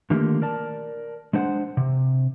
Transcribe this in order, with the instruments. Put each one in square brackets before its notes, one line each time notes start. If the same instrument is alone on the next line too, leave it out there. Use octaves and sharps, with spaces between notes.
[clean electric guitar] D3 D#3 A3 A#3 F4 G4
A#4 D5 A5
G#3 D4 C5 F#5
C3